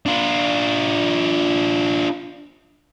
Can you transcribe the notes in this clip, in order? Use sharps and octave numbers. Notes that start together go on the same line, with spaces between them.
D4 F4